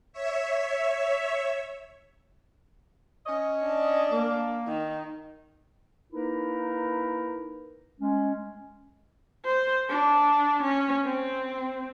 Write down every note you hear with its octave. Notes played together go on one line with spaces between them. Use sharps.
C#5 E5
C#4 C#5 D#5
D4
A#3
D#3
A#3 D#4 E4 A#4 B4
G#3 C#4
C5
D4
C#4
C4